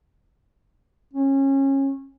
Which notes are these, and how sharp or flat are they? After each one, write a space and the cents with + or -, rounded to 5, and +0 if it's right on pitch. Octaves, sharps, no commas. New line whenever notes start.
C#4 -25